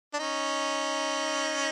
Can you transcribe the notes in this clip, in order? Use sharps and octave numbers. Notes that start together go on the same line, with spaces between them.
D4
C#4 D#4